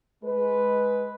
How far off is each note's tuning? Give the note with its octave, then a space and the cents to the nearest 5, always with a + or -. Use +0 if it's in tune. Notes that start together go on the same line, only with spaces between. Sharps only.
G#3 +15 B4 +0